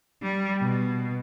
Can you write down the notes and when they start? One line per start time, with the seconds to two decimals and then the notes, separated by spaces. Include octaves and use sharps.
0.22 G3
0.61 B2